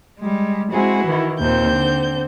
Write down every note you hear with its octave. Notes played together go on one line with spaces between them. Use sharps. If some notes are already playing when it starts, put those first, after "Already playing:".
G3 G#3
G#3 C4 E4 F#4 G#4
D#3 E3
D#2 A#2 C4 G6
D3